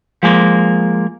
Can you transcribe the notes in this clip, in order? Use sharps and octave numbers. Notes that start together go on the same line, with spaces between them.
F3 G#3 A#3